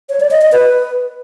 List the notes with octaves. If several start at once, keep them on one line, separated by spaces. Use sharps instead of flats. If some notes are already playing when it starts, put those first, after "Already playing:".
C#5
D5
D#5
D#5
B4